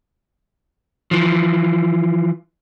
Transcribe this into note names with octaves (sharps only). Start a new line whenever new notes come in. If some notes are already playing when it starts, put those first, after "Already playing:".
E3 F3